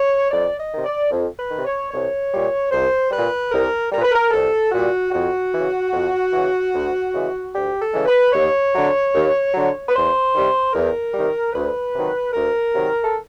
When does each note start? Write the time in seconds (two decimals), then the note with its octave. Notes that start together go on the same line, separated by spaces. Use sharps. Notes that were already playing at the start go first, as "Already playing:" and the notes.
Already playing: C#5
0.31 F2 D5
0.58 D#5
0.71 C3 D#3
0.85 D5
1.11 F2
1.37 B4
1.51 C3 D#3
1.65 C#5
1.91 C2 C#5
2.32 A#2 G3
2.71 C2 C5
3.11 A#2 G3 B4
3.52 C2 A#4
3.91 A#2 G3 A#4
4.02 B4
4.12 A#4
4.31 C2 A4
4.72 A#2 G3 F#4
5.12 F2 F#4
5.52 C#3 E3
5.92 F2
6.32 C#3 E3
6.72 D2
7.13 C#3 E3 G#3
7.52 D2 G4
7.79 A4
7.93 C#3 E3 G#3
8.06 B4
8.32 D#2 C#5
8.73 D3 F#3
9.12 D#2
9.53 D3 F#3
9.87 B4
9.93 E2 C5
10.33 C3 D#3 G3
10.73 E2 A#4
11.13 C3 D#3 G3
11.53 D2 B4
11.94 C3 D#3 F#3
12.33 D2 A#4
12.73 C3 D#3 F#3
13.02 A4